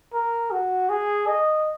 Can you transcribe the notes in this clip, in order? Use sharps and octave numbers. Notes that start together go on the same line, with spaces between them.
A#4
F#4
G#4
D#5